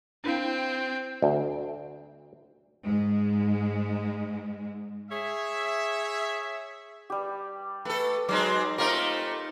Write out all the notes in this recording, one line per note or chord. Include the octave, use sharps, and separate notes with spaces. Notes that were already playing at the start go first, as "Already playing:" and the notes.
C4 D4 E4 F5 G5
D2
G#2 G#3
G#4 C#5 E5
G3 G4
A3 A4 B4
F#3 G#3 C4 D#4 D6
A3 C4 D#4 F4 G4 A#4